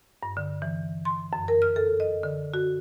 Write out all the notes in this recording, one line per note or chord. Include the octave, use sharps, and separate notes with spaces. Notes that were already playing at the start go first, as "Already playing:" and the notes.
G2
D3
E3
C6
F#2
A#4
F6
A4
D#5
D3
F#4